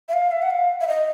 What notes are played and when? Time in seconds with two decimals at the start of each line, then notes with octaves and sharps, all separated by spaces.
0.09 E5
0.13 F5
0.32 E5
0.42 F#5
0.50 F5
0.81 E5
0.88 D#5